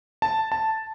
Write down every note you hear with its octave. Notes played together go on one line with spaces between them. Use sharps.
A5
A5